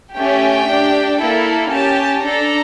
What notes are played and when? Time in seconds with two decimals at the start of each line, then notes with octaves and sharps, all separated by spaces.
0.15 A3 C#4 G4 G5
0.67 D4 G4
1.19 A#3 E4 A4
1.71 C#4 G4 A5
2.23 D4 A4 A#5